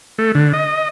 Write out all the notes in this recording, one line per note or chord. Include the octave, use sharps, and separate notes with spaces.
A3
D3
D#5